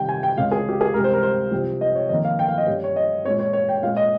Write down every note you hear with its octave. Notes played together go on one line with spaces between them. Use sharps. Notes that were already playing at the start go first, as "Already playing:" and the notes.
Already playing: C3 D#3 G3 G5
G#5
G5
C#2 C#3 G#3 C#4 F5
G#4
G4
G#4
C#2 C3 G3 A#4
C5
A#4
C5
C2 C3 F3 C4
D#5
C#5
F2 D#3 A#3 D#5
F5
G5
F5
D#5
G2 G3 C#4
C#5
D#5
A#2 G#3 C#4 C#5
C#5
C#5
G5
A#2 G#3 C#4 F5
D#5